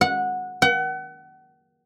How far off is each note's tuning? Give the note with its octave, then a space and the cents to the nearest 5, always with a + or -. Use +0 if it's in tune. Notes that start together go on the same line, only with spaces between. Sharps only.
F#5 -15
F#5 +35